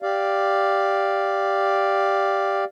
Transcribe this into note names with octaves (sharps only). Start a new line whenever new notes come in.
G4 D5 F5